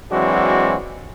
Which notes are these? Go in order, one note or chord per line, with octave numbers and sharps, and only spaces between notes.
E3 F#3 G#3 C4 D4 F#4